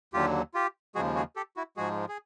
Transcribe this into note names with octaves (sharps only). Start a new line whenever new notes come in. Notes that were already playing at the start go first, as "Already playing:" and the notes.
D#2 D3 F#3 F4 G4
F4 G4
D#2 C#3 F3 G#3 F#4 G#4
F#4 G#4
G4 A4
E4 F#4
G#2 F3 G#3 F#4 G#4
G#4